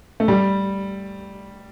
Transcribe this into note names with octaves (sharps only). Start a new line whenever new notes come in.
A3
G3